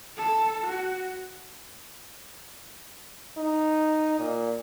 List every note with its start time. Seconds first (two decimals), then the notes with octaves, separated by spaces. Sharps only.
0.17 A4
0.66 F#4
3.37 D#4
4.19 A#2